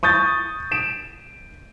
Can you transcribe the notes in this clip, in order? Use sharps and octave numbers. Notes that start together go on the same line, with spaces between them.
C#6 D#6 G6 A6
D7 E7